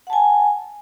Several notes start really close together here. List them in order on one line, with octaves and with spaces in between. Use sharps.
F#5 A5 G#5